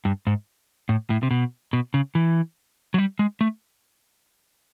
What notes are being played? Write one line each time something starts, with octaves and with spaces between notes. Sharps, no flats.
G2
G#2
A2
A2
C3
B2
B2
C#3
E3
F#3
G3
G#3
A3